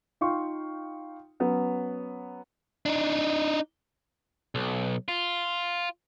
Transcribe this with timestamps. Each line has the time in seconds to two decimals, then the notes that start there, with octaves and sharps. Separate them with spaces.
0.21 D#4 F4 F5 G5 C6 C#6
1.40 F#3 B3 C#4
2.86 D4 D#4
4.55 B1
5.08 F4